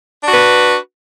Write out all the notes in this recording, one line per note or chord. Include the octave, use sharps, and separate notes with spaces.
D4 F#4 B4